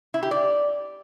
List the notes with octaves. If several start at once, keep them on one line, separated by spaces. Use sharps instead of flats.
E4
G4
D5